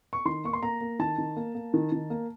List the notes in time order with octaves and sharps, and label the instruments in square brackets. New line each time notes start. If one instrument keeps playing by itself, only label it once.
[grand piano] C#6
D#3 C6
A#3 C#6
C6
A#3 A#5
A#3
D#3 A5
D#3
A#3
A#3
D#3
D#3
A#3